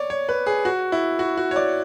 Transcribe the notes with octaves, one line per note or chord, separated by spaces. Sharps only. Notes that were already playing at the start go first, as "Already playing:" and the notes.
Already playing: C#5 D5
C#5
B4
G#4
F#4
E4
F#4
F#4
C#5
D5